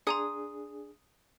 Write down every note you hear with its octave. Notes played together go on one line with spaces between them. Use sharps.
D4 G#4 G#5 A#5 C6 D#6